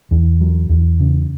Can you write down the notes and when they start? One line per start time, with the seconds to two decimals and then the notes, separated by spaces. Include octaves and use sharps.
0.11 E2
0.41 F#3
0.69 E2
1.00 C#3